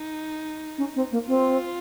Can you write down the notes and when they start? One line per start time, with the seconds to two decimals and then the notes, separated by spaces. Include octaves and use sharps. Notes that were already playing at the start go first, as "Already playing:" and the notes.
Already playing: D#4
0.78 C#4
0.95 C4
1.11 A#3
1.27 C4 F4